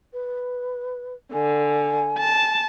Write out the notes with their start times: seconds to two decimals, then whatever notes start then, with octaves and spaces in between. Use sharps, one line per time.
0.13 B4
1.33 D3 G#5
2.18 A5